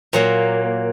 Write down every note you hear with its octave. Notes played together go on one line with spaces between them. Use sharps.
A#2 F#3 A#3